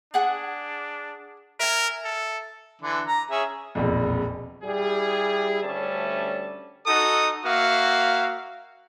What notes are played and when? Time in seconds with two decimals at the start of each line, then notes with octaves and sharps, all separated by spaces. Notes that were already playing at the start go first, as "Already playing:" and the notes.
0.14 D4 G#4 F#5 G#5
1.60 A#4 E5 G#5
2.04 A4
2.81 D3 E3
3.07 A#5
3.31 C#4 G#4 E5
3.75 E1 A#1 F2
4.64 G3 E4 G4 G#4
5.63 D2 G3 A3 C#4 E5 A5
6.86 D#4 F#4 A4 D#6
7.45 A#3 F#4 E5 F5